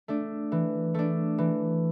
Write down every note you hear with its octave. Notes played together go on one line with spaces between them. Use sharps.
A3 D4
E3
A3 D4
E3